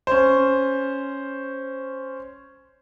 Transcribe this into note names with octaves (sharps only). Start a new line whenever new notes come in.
C#4 C5